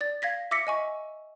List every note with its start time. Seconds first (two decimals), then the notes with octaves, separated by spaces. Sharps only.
0.01 D5 A6
0.22 F5 G#6 A#6 B6
0.51 E5 D6 E6 A#6 B6 C#7
0.67 D#5 G#5 C#6